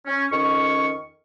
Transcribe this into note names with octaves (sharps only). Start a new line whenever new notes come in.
C#4
F2 D#3 C#4 C#6